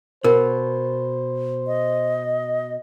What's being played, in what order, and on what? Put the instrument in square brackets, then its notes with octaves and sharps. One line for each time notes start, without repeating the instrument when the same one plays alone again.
[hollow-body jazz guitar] B2 [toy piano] A#4 [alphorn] C5
[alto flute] D#5